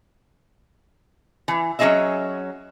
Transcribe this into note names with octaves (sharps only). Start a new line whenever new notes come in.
E3
F#3 C#4 E4 G#4 D#5 E5